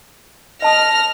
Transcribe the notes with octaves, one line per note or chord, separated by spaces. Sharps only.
D#5 A5 D#6 F6 A#6